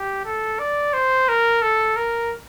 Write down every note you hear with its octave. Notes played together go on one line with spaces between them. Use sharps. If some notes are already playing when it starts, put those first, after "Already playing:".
Already playing: G4
A4
D5
C5
A#4
A4
A#4